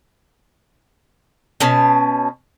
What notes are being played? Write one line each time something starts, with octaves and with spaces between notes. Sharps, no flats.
B2 C#4 A5